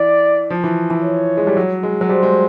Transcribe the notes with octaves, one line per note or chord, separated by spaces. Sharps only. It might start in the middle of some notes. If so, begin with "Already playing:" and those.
Already playing: E3 D5
F3
E3
E3
C#5
G#3
G3
F#3
G#3
F#3
G3 C5
G#3